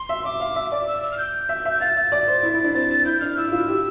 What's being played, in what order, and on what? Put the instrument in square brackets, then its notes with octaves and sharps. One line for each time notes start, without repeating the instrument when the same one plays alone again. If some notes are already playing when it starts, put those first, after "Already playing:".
Already playing: [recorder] C6
[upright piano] E5
[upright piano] E5 [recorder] D6
[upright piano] F5
E5
D5
[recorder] E6
E6
F6
G6
[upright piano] E5
E5
[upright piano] F5 [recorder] A6
[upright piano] E5
D5
C5
E4
E4
D4
[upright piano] C4 [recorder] A6
[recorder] A6
[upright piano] E4 [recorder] G6
[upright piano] D4 [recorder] F6
[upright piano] E4 [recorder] E6
[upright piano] E4
F4
G4